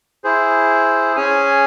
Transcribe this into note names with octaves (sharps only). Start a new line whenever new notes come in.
E4 G#4 C5
C#4 G#4 C#5 G#5